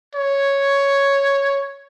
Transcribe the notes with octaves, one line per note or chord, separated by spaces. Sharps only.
C#5